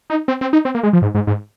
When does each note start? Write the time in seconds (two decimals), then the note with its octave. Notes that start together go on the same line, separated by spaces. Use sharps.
0.10 D#4
0.28 C4
0.41 C4
0.53 D#4
0.65 C4
0.75 A#3
0.83 G#3
0.93 F3
1.02 G#2
1.15 G#2
1.27 G#2